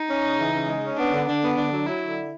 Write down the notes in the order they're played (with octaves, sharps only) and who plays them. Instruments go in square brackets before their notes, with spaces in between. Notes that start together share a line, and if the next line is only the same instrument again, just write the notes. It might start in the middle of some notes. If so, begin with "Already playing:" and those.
Already playing: [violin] D#4
[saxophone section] C#4
C#3
E3
C#3
G#3
C#4
[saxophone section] B3 [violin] D4
[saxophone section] D3
[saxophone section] D3 [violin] D4
[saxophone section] B3
[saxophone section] D3 [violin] D4
[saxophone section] F#3
[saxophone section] F#3 [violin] E4
[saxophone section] D3